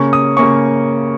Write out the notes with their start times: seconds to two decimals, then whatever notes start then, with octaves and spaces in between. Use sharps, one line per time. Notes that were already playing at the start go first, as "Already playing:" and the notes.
Already playing: C#3 A#3 C#4 C#6
0.13 D#6
0.37 C#3 A#3 C#4 C#6